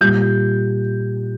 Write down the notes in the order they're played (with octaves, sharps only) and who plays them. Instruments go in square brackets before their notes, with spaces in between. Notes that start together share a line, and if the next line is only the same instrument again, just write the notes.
[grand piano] A#2 G3 G6